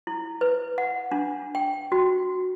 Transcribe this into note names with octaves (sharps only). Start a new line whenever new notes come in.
E4
B4
F#5
D4
G5
F#4